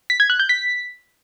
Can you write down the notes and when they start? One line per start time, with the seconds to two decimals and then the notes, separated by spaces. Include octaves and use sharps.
0.10 B6
0.20 G#6
0.30 F#6
0.40 G6
0.49 B6